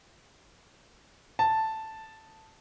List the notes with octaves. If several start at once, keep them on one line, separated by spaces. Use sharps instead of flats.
A5